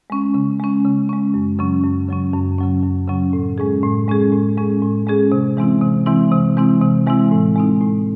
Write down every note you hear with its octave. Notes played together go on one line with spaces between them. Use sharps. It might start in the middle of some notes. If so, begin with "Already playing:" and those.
G#3 C#4
C#3
G#3 C#4
C#3
G#3 C#4
F#2
C#3 F#3 C#4
F#2
C#3 F#3 C#4
F#2
C#3 F#3 C#4
F#2
C#3 F#3 C#4
A2
G#3 C#4 G#4
A2
G#3 C#4 G#4
A2
G#3 C#4 G#4
A2
G#3 C#4 G#4
C3
E3 G#3 C4 E4
C3
E3 G#3 C4 E4
C3
E3 G#3 C4 E4
C3
E3 G#3 C4 E4
A2
G#3 C4 D#4
A2